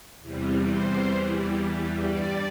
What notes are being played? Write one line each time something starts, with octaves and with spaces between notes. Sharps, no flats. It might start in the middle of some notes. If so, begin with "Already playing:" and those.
E2 C3 E3 G3
C5
E2 E3 G3
G2 G3 D5